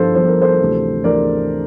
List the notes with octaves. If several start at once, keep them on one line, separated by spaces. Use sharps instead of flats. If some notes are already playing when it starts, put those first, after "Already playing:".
Already playing: G1 G2 F3 A4 C5
G1 G2 F3 C5
A#4
A4 C5
D2 C3 E3
D2 C3 E3 A#4 D5